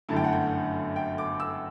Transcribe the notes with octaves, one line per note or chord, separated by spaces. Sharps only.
G1 F#2 D3 A3 E4 A5
G5
F#5
G5
G5
D6
E6